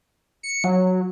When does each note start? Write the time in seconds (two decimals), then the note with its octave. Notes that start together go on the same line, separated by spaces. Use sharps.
0.43 C#7
0.64 F#3